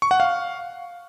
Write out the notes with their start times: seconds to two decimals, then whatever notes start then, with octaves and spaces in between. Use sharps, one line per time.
0.02 C#6
0.11 F#5
0.20 F5